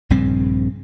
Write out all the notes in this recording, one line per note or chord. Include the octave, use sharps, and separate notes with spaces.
A#1 G2 C#3 C4